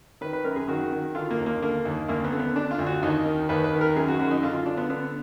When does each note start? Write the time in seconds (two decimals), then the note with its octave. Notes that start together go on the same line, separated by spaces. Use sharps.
0.21 D#3 B4
0.33 B4
0.44 F#2 A#4
0.56 G#4
0.68 D#3 F#4
0.92 D#3
1.15 D3 F4
1.30 A#3
1.39 D#2
1.46 A#3
1.62 D3 A#3
1.85 D#2
2.08 D2 A#3
2.24 B3
2.33 D3
2.39 B3
2.56 D3 D4
2.71 F4
2.79 D2
2.86 F#4
3.03 D#2 D#4
3.26 D#3
3.49 D#2 B4
3.64 B4
3.73 D#3
3.81 A#4
3.95 F#2 G#4
4.08 F#4
4.19 F#2 F#4
4.31 D#4
4.43 D3 F4
4.55 F4
4.66 D3 D4
4.77 B3
4.90 D3 B3